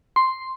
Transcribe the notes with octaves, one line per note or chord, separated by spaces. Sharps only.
C6